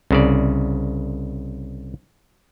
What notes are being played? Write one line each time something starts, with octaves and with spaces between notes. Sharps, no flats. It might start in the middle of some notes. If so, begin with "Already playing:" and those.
C2 C#3 D5